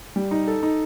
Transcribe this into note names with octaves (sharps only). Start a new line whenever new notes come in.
G3
D#4
A4
D#4